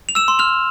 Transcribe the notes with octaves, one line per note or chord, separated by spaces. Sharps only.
F7
E6 E7
C6
F6 F7